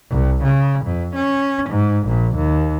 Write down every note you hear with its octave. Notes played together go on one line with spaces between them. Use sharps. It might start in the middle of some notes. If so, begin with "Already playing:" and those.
C2
C#3
F2
C#4
G#2
A#1
D#2